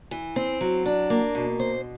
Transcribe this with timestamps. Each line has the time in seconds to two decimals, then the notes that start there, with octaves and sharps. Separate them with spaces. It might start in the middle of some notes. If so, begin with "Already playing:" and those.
0.11 E3
0.36 C4
0.61 F#3
0.85 D4
1.10 A#3
1.35 B2
1.60 C5